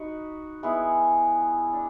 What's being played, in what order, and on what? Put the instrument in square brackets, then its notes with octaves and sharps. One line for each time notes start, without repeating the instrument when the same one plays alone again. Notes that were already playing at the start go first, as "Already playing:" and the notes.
Already playing: [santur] D#4 F#4 B4
G#3 B3 E4 G#4
D4